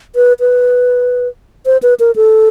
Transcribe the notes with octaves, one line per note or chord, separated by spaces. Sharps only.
B4
B4
C5
B4
A#4
A4